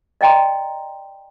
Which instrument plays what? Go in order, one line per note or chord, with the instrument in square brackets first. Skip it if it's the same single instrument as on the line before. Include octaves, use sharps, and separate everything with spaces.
[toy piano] D5 D#5 G5 A#5 C6